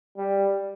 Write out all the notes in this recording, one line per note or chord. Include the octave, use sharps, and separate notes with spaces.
G3